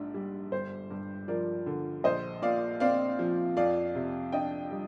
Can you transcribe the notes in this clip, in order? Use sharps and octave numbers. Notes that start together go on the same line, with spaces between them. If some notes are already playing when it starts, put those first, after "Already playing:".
Already playing: A#1 G#2 D4
G3
G1 C5
G2
F3 A#4 D5
D3
A#1 C5 D#5
A#2 D5 F5
C4 D5 F5
F3
F2 D5 F5
C3
D4 D#5 G5
G3